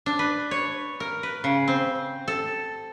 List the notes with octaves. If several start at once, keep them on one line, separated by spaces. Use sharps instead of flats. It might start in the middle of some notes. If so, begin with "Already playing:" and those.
D4
B4
C#5
A#4
B4
C#3
C4
A4